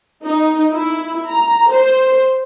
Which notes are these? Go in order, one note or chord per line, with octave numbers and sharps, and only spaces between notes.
D#4
E4
A#5
C5